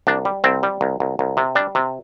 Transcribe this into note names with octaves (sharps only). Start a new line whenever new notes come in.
C2 D4
G3
C2 C4
G3
C2
C2
C2
C3
G3 D4
C3